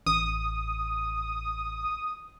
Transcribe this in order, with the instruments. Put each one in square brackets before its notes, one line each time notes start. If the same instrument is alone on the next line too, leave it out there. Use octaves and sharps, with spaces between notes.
[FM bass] A1 [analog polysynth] D#6